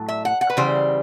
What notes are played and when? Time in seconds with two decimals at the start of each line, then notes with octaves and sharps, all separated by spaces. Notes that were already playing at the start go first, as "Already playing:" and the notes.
Already playing: A2 F#3 A3
0.08 E5
0.25 F#5
0.41 F#5
0.50 B4
0.57 C#3 E3 G3 C5